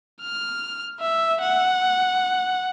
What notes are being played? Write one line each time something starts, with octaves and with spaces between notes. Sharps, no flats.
F6
E5
F#5